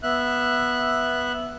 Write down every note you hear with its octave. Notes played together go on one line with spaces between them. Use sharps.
B3 E5 F#6